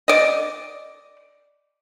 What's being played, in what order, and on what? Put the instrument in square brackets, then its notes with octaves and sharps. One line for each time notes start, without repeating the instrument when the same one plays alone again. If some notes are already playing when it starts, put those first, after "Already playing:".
[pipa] D5 D#5